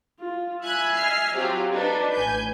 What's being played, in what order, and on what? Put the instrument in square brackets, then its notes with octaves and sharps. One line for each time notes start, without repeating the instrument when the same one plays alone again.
[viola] F4
[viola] E5 G#5 [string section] B5 F#6 G#6
[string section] D#5 F6 C7
[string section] F#3 C4 F4 [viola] G4
[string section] D4 D#4 A4 [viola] B4
[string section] A1 G#5 G6